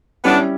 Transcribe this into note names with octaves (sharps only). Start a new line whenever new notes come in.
G3 B3 C#4 D4 E4